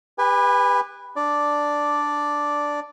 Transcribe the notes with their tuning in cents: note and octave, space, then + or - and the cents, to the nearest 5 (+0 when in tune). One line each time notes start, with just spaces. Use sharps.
G4 +30 B4 +0 G#5 -30
D4 +0 D5 +0